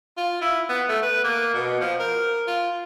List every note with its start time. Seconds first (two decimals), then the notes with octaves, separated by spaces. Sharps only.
0.17 F4
0.41 E4
0.69 B3
0.89 A3
1.02 B4
1.24 A#3
1.54 B2
1.81 F3
1.99 A#4
2.47 F4